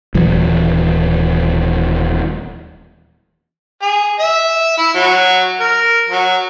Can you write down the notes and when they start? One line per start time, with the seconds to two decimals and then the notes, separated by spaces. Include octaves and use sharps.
0.15 D#1 E3 F#3
3.82 G#4
4.20 E5
4.78 E4
4.94 F#3
5.60 A#4
6.09 F#3